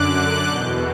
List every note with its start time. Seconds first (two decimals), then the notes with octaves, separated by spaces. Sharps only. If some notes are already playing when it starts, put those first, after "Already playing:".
Already playing: F#2 D3 D6 F#6
0.14 F#6
0.47 E2 B2 G6